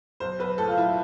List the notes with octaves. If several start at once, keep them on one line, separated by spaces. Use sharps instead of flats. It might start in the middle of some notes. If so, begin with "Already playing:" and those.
B1 C5
B1 B4
A2 A4
F4
B1 E4